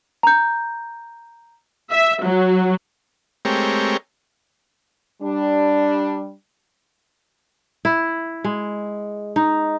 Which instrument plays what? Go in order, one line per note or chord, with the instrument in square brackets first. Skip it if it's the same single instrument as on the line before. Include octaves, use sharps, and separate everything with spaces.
[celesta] A#5 G6
[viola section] E5
F#3
[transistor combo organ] G#3 A3 C4 G4 A#4 C#5
[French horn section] G3 D4
[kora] E4
G#3
D#4